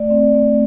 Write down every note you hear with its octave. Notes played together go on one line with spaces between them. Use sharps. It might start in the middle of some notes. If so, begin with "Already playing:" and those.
Already playing: A3 D5
C4
A3